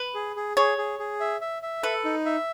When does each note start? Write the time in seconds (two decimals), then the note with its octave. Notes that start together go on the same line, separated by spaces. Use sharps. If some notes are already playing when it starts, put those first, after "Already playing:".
Already playing: B4
0.15 G#4
0.36 G#4
0.57 G#4 C#5
0.78 G#4
0.99 G#4
1.20 E5
1.41 E5
1.62 E5
1.83 A4 B4
2.05 D#4
2.26 E5